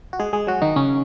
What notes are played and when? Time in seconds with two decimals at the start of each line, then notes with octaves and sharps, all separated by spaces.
0.13 F#4
0.19 G#3 G#4
0.33 G#3 G#4
0.47 F#3 F#4
0.62 D#3 D#4
0.76 C#3 C#4